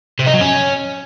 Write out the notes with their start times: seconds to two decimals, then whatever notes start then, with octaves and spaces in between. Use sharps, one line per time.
0.19 C3
0.26 D#4
0.34 F#3
0.41 C#4